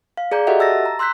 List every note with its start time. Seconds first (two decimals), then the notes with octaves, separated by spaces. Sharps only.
0.17 F5
0.31 G#4 D5 A#5 G6
0.47 F#4 G4 A4 D#5 E5 F#5
0.59 A5 E6 A6 A#6
0.86 A#5
0.99 C6 E6 F#6 G6 B6